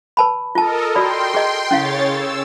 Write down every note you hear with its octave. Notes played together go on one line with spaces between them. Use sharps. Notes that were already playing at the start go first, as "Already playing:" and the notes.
B4 A5 B5
F4 A4 A#4 D#5 A5
F#4 D5 G5 B5 C6
G#4 D#5
C#3 C#4 E4 C#5 F5 A6
E6